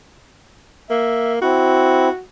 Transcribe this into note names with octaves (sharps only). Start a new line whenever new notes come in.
A#3 E5
C4 E4 F#4